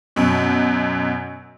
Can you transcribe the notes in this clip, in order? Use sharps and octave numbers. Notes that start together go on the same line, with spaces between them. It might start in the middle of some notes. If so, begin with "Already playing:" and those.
F#2 B2